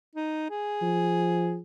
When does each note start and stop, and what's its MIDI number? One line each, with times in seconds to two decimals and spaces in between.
0.15 0.50 63
0.50 1.58 68
0.82 1.59 53